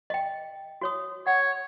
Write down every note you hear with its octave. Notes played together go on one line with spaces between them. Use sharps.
D#5 G5
F#4 C#5 D#6
C#5 F#5